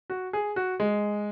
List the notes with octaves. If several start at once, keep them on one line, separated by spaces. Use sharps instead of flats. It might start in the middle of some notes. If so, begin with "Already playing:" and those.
F#4
G#4
F#4
G#3